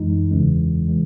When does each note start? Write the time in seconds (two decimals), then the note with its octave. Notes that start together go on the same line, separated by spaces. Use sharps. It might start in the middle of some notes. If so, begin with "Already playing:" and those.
Already playing: F#2 E3 G#3 D#4
0.31 E2 C#3 E3 G#3 C#4
0.88 E3 G#3